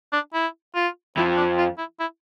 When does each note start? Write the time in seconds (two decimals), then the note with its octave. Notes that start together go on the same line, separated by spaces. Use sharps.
0.13 D4
0.34 E4
0.75 F4
1.16 F2 F3 E4
1.36 D4
1.58 F4
1.78 E4
1.99 E4